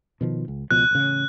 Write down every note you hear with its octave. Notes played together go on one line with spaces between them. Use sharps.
B2 D#3 F3
C#2
C#2 B2 F3 F#6
A1 C#3